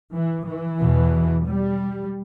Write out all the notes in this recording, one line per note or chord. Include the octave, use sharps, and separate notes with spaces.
E3
E3
E2 B2
G3